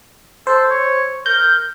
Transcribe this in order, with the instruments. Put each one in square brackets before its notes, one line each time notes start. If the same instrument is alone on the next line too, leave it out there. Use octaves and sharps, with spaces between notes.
[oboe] A4 [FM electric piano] C5
[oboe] C#5
[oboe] A#4 [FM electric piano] G6